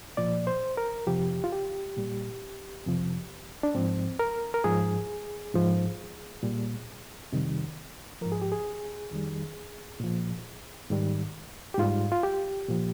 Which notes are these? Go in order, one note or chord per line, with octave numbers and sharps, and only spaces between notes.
A#2 F3 D5
C5
A#4
F2 C3 F3 G4
F4
G4
A#2 G3
F2 C3 F3
D4
G#2 F3 C4
A#4
A#4
G#2 F3 G#4
G#2 F3
A#2 G3
F2 C3 D#3 G3
G#2 F3 A#4
G#4
G4
G#4
F2 D#3 G3
A#2 F3
G#2 D#3 G3
G4
G#2 G3 F4
F4
G4
A#2 F3